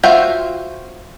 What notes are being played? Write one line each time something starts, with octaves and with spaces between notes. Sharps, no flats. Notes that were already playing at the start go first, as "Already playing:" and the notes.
F4 F#4 C5 E5 G5